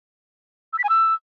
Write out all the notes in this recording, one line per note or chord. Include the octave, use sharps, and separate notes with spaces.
E6
B6
G#5
E6